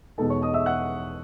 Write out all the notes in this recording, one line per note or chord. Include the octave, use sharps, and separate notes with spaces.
E2 B2 G#3 D#4 A4 A5
C#5 C#6
D#5 D#6
E5 E6
F#5 F#6